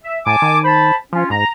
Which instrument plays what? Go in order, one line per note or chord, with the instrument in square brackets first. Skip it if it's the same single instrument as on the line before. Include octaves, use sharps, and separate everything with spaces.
[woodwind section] E5
[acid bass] A2 [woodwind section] G#5 A5 D6
[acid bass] D#3
[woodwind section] C5 A5 B5
[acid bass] F3 [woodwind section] C#4 F4
[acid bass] G#2 [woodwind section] A#5